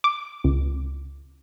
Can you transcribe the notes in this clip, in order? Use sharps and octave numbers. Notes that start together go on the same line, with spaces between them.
D6
C#2